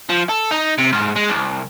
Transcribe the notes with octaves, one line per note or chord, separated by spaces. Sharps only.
F3
A4
D#4
C3
G#2
G#3
C2